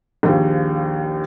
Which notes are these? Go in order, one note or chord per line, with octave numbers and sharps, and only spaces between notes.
A#1 D#2 F3